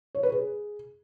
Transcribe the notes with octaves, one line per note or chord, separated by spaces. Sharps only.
C#5
B4
G#4